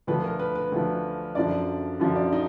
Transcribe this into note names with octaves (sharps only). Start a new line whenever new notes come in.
D2 D3 F3 B4
A#4
B4
B4
D2 D3 F3
F#2 D3 F3 D5
F#2 D3 F3
D5
D#4